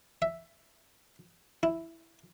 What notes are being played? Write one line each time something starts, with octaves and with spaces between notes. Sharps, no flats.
E5
E4